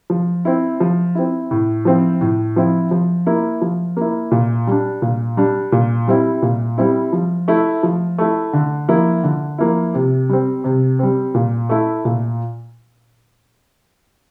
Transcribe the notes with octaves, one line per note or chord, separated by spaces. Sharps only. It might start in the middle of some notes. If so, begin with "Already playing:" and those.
F3
C4 E4
F3
C4 E4
A2
F3 C4 E4
A2
F3 C4 E4
F3
A#3 E4
F3
A#3 E4
A#2
G3 D4
A#2
G3 D4
A#2
G3 C4 E4
A#2
G3 C4 E4
F3
A3 E4
F3
A3 E4
D3
F3 A#3 E4
D3
F3 A#3 E4
C3
G3 C4
C3
G3 C4
A#2
A3 E4
A#2